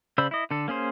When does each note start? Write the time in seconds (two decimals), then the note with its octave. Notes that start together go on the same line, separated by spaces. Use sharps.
0.18 C#3 C5 D5 B5 E6
0.31 E4 D#5
0.51 D3 A4
0.68 A#3 C#4 G#4 C5